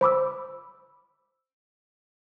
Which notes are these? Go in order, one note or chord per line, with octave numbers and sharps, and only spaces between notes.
C5 B5 D6 E6